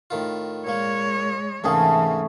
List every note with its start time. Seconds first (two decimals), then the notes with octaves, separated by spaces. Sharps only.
0.10 A2 D#3 F4
0.67 A#2 G#3 A#3 C#5
1.64 G#2 C3 E3 A3 A#3 C#4 G#4